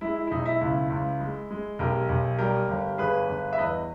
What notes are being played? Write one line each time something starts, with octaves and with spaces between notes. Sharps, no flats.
G#3 E4
E4
E4
B1 D#4
E4
C#2 E4
C#2
G#3
G#3
B1 G4 A#4
B1
G3 G4 A#4
G1
G1 G#4 B4
G1
E5
E2 B4 D#5